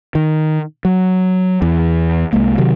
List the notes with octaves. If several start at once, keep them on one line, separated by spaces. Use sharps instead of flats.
D#3
F#3
E2
C2 G#3 A#3
C3 D#3 F#3